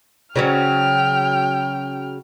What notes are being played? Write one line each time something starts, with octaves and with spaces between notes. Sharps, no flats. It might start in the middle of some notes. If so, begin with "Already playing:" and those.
C#3 F#3 C#4 G5 F6